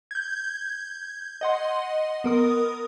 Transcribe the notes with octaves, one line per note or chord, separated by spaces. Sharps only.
G6 G#6
D#5 F#5 C6
B3 A#4 D#6